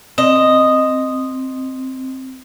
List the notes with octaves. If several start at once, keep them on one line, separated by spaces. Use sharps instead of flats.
C4 D#5